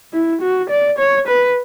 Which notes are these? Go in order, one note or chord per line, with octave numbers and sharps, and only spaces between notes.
E4
F#4
D5
C#5
B4